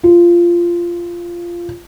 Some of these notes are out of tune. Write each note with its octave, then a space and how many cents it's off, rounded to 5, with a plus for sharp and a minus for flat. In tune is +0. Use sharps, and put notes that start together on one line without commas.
F4 -15